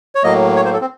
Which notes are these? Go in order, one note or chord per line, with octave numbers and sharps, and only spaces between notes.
C#5
A2 F#3 A#3 D#5
C#5
C5
A4
C4